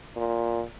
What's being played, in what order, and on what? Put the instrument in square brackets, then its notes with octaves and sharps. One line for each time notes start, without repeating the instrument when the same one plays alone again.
[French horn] A#2